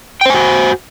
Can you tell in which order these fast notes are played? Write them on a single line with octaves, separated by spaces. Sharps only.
G5 C5 G#5 F#4